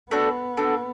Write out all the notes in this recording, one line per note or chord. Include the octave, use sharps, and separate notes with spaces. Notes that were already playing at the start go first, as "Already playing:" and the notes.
A3 B3 D4 F#4
A3 D4 F#4